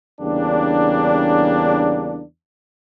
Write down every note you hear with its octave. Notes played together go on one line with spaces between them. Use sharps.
E2 C#3 G3 A#3 D4